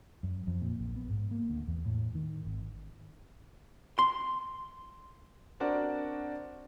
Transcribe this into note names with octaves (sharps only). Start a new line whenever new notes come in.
F#2
F2
A#2
A#1
B3
G#2
A#3
D2
E2
A2
D#3
G#1
C6
C4 D4 F#4 A#4 D5